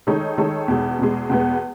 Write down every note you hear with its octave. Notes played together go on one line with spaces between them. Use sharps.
D#3 G#3 D#4 A4 C#5
D#3 G#3 D#4 A4 C#5
E2 B2 G#3
E2 B2 G#3
E2 B2 G#3 B3